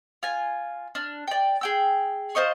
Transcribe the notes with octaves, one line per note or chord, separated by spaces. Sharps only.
F4 G#5
D4 F6
D5 G5
G#4 G5 E6
F4 C5 D#5 C#6